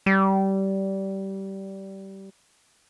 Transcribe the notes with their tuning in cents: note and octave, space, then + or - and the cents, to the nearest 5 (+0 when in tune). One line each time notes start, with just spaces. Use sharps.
G3 -20